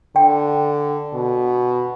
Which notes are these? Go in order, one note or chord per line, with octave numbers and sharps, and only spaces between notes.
D3 G5
B2